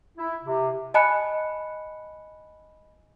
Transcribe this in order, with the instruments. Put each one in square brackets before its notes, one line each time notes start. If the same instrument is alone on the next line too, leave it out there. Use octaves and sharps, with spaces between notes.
[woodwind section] E4
C3
[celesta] D#5 G#5 A5 B5 F#6 C#7